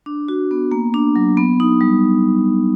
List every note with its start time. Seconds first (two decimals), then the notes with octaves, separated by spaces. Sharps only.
0.06 D4
0.28 F#4
0.51 B3
0.72 A#3
0.94 D4
1.16 F#3
1.37 B3
1.60 D#4
1.81 G3